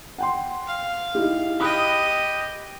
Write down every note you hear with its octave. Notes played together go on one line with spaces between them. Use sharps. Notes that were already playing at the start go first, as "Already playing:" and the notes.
F#5 G5 C6
F5
D#4 E4 G4
G4 D#5 B5 D#6 F#6